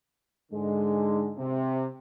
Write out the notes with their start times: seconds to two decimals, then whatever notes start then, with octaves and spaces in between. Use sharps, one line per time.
0.51 G#2 D3 G#3
1.37 C3